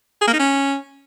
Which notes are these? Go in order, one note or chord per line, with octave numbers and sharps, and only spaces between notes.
G#4
A#3
D#4
C#4